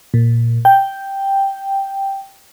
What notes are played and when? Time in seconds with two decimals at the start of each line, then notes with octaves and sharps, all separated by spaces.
0.14 A#2
0.65 G5